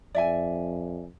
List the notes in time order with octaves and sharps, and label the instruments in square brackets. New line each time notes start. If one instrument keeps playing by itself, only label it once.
[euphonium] F2 [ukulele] D5 E5 G#5